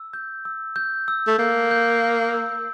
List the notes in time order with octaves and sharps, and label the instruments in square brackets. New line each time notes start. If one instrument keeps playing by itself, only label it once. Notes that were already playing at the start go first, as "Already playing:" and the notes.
Already playing: [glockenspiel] E6
G6
E6
G6
E6
[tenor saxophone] A3
[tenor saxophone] A#3 [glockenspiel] G6
[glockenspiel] G6
G6
E6